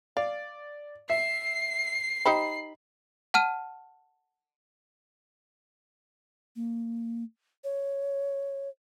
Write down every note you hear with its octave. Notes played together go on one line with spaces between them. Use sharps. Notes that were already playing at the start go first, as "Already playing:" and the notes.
D5 F5
E5 C7
D#4 G4 C5 B5
F#5 A5 F6 D#7
A#3
C#5